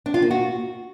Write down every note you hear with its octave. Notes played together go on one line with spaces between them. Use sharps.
D4
F4
A#3
F#4